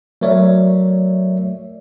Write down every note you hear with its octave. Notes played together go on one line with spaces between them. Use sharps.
F#3 A3 A#4 C#5 D5 E5